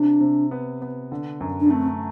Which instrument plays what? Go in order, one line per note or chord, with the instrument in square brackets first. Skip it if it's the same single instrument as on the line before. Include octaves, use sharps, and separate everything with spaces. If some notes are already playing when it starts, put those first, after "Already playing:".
Already playing: [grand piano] C3 [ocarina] D4
[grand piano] C3
B3
B3
D3
F#2
[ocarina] D4
[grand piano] A3 [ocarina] C4